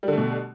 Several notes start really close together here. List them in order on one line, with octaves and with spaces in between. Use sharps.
G3 D3 A3 B2